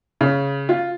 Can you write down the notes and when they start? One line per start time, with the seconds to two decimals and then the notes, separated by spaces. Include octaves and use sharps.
0.21 C#3
0.69 F4